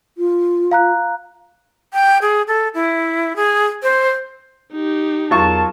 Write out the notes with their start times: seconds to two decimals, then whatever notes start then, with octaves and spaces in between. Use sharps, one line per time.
0.18 F4
0.71 F5 A#5 F#6
1.94 G5
2.22 G#4
2.48 A4
2.75 E4
3.36 G#4
3.83 C5
4.72 D#4 G4
5.31 E2 F#3 F4 A#4 A5 C#6